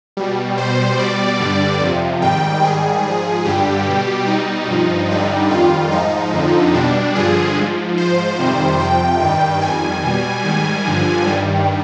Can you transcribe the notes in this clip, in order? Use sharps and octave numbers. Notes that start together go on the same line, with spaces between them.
B2 G3
B2 G3 C5
B2 G3 D5
G2 D3 G3
F2 C3 F3
G#2 D#3 G3 G5
G#2 D#3 G3 G#4
G#2 F3
G2 D3 G3 G4
B2 G3
B2 G3 D#4
G2 F3
G2 D3 G3 D#4
F2 D#3 G3 F4
G#2 F3 D#4
F2 D3 F3
B2 G3 D4
G2 D3 F3 G#4
G#2 F3
G#2 F3 C5
F2 C3 D#3 G3
F2 C3 F3 G5
G2 D#3 G3 G5
F2 D#3 G3 G#5
B2 G3
G#2 D#3 G3 G#5
G2 D3 F3
G2 D#3 G3